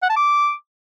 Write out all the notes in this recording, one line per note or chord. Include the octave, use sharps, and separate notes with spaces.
F#5
A5
D6